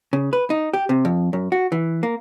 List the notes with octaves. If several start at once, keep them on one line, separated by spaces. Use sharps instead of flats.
C#3
B4
D#4
G4
C3
F2
F#2
F#4
E3
A#3